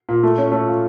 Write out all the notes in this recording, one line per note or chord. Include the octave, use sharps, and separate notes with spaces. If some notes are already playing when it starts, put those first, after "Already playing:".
A#2
A3
C#4
A3
F4